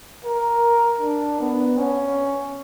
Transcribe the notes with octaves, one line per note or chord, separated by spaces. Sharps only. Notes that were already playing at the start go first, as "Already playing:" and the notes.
A#4
D4
B3
C#4